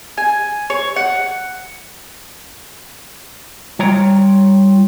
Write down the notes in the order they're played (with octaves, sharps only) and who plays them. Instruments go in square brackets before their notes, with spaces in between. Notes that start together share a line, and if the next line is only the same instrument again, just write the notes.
[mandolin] G#5
C#5
F#5
[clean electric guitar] G3 F4 C#5 G5 A#5